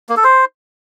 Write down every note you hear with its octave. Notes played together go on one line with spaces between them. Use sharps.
A#3
A4
C5